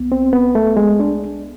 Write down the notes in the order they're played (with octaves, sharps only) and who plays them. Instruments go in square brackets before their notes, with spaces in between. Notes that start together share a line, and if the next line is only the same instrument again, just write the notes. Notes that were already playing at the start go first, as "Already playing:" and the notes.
Already playing: [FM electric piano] C2 B3
[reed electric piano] C4
B3
A3
G#3
D4